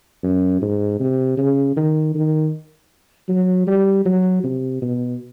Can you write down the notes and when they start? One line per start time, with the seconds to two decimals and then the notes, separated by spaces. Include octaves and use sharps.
0.23 F#2
0.62 G#2
1.00 C3
1.37 C#3
1.76 D#3
2.15 D#3
3.29 F#3
3.67 G3
4.05 F#3
4.44 C3
4.82 B2